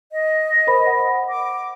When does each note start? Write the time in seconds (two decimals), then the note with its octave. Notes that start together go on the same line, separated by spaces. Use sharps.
0.12 D#5
0.67 A#4 C5 B5
0.87 F#5
1.29 D6